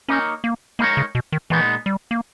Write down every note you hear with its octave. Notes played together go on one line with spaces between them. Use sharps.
A#3 C#4 D#4 A#4 C#5
A#3
G#3 A#3 D#4 A#4 C#5
C#3
B2
D#3
A#2 E3 G#3 B3 D#4
G3
A#3